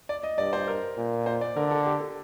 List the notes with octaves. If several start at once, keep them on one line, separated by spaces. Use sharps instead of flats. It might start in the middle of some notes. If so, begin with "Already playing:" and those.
D5
D#5
G2 D5
C5
A#4
A#2
C5
D5
D3 A#4
A4
G4
A4